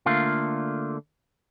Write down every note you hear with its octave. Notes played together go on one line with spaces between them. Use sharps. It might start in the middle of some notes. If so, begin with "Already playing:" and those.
D3 A3 A#3 D4 F4